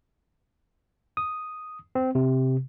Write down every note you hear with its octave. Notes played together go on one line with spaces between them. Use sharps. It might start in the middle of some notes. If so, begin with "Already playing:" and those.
D#6
C4
C3